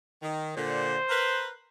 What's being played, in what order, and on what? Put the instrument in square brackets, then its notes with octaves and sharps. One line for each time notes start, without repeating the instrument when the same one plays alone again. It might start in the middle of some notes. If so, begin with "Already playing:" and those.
[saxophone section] D#3
[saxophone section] A#2 D3 [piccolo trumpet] C5
[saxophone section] A#4 B4